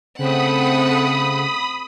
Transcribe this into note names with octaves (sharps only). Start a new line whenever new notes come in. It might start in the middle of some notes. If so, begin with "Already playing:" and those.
C#3 A3 C4 F#5 B5 D#6